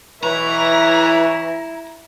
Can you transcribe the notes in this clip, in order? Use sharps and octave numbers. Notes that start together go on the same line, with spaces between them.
E3 E4 B4 C#5 A#5 C#6